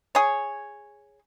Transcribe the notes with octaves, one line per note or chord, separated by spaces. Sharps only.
G#4 C#5